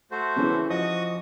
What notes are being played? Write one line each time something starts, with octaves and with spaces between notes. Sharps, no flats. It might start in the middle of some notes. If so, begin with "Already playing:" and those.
A3 F#4 C5
C#3 E3 C#4
F3 F#4 D#5 C#6 D#6